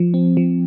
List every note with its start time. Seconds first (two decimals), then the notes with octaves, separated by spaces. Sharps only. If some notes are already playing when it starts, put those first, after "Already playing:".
Already playing: F3
0.14 C4
0.37 F3